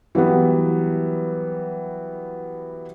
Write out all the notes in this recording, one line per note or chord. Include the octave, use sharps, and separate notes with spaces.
E3 F#3 G3 B3